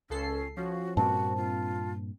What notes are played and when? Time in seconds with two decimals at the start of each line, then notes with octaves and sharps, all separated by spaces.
0.10 C#2 C#4 A4 C7
0.57 F3 C#4 F#4
0.97 G2 A#2 A#3 C4 F#4 A5
1.37 F4